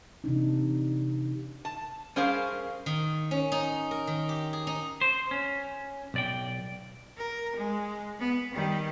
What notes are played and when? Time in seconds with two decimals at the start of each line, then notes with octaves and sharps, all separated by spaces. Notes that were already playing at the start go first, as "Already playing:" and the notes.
0.24 C3 E3 D4 D#4
1.65 A5
2.16 G3 C#4 G#4 A#4 C5 F5
2.86 D#3
3.31 C#4
3.52 D#4
3.91 A#4
4.07 D#3
4.29 G4
4.53 G#4
4.67 D#4
5.01 C5
5.31 C#4
6.14 B1 D5 G5
7.18 A#4
7.56 G#3
8.19 B3
8.53 D#3 G3